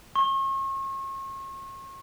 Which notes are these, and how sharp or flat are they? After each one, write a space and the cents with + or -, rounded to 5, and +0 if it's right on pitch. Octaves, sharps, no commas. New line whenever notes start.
C#6 -40